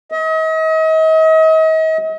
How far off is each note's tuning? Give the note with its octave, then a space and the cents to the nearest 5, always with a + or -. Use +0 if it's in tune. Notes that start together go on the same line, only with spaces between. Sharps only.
D#5 +40